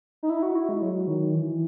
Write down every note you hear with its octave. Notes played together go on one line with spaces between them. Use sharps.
D#4
E4
F#4
E4
G#3
F#3
D#3
E3